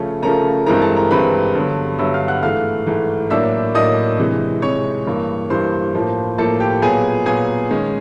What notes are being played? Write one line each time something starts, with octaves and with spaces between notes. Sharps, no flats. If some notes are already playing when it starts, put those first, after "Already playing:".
Already playing: C#3 F3 A3 C#4
C#3 F3 A3 C#4 A#4 A#5
G2 E3 G#3 C4 E4 A#4 A#5
A4 A5
A#4 A#5
G2 E3 G#3 C4 E4 B4 B5
G2 D3 F#3 B3
G2 D3 F#3 B3 E5 E6
F5 F6
F#5 F#6
G#2 E3 A3 F5 F6
G#2 E3 A3
A2 F#3 A#3 D4 E5 E6
A2 F#3 A#3 D4 D#5 D#6
C3 E3 G#3
C3 E3 G#3 C#5 C#6
G2 E3 G3 A#3
G2 E3 G3 A#3 C5 C6
A2 F3 A#3
A2 F3 A#3 A4 A5
G4 G5
A#2 F#3 B3 G#4 G#5
A#2 F#3 B3 G#4 G#5
D#3 G#3 C#4